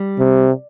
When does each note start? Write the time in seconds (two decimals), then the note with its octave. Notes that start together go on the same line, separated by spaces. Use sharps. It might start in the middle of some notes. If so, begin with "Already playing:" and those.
Already playing: G3
0.19 C3